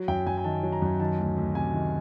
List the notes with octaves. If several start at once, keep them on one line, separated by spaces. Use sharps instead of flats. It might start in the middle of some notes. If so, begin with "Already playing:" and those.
Already playing: F#3
F#2 G5
F#2 G#5
G#5
D#3 A5
F#3
A#5
F#2
D#3 A5
D2
D2
C3 G#5
D#3